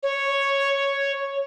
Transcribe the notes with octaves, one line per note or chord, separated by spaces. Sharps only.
C#5